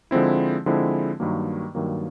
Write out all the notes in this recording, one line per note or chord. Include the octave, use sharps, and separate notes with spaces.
D3 F3 G#3 C4 E4
D3 F3 G#3 C4 E4
G2 D#3 F#3 A#3
G2 D#3 F#3 A#3